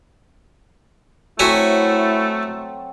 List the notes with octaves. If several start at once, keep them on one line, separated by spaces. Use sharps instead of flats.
F#3 A3 C4 E4 F#4 A4 E5 G#5